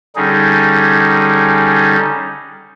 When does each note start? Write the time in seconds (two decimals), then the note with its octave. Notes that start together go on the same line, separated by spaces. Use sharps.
0.16 D3 G3 C#4 D#4 G#4